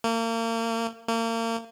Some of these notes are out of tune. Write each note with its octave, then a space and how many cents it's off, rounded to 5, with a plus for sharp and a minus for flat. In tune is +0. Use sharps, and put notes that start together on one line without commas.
A#3 -35
A#3 -35